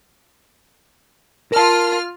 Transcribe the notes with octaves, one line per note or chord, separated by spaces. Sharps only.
F4 A#4 A5 F6